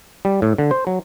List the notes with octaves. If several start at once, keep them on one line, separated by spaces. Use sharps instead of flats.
G3
A2
D3
C5
F#3